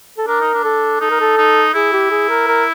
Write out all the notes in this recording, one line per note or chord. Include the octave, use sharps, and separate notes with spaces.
A4
D4 A#4
D#4
D4
A4
D#4 A4
A#4
A4
D#4
E4 G#4
G4
G#4
A#4
A#4